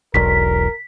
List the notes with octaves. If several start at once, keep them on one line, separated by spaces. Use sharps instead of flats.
E1 B1 A#4 B6